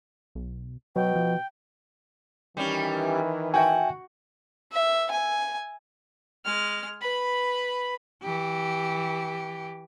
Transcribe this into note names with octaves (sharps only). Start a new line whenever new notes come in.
B1
B2 F#3 G5
F3
D#3 E3 G3 C#4
F#4 E5 G5 G#5
E5
G#5
G#3 F6
B4 B5
E3 G4